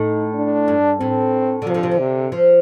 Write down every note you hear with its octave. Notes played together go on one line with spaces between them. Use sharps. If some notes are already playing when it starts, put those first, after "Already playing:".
Already playing: A2 D#4
D4
G2
A2 C4
D3
C3 F3
D3
C3
D3
C3
F3